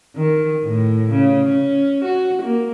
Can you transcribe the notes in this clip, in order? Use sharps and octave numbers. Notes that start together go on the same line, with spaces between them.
D#3
A2
C#3
C#4
F#4
A#3